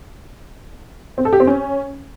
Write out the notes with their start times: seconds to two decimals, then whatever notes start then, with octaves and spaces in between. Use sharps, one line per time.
1.18 C4
1.25 A4
1.33 G4
1.40 C4
1.47 C#4